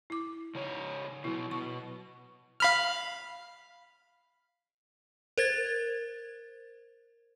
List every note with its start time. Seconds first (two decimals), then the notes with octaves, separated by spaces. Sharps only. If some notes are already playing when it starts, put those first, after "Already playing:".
0.10 E4 D6
0.55 C#3 D#4 C#5
1.24 B2 F#3 E4
1.51 B2 C#6
2.60 F5 B5 F6
5.38 A#4 C5 G#6 A6